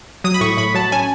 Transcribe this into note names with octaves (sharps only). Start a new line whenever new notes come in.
F#3 D#6
B5
A2 C#6
A2 B5
F#3 A5
C#4 G#5